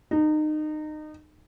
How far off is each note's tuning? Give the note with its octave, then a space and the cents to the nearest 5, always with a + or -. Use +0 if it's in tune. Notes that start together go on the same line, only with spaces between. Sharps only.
D#4 -25